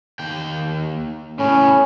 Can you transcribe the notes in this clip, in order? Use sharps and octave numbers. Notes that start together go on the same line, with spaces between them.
D#2 G5
A2 B3 C#4